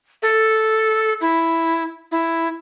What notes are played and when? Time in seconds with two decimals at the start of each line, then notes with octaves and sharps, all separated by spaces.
0.22 A4
1.21 E4
2.12 E4